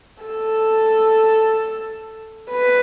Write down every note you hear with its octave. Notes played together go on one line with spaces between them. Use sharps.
A4
B4